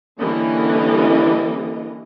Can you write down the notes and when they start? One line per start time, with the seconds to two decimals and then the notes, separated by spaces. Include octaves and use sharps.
0.19 D3 E3 G3 A#3 C#4 D#5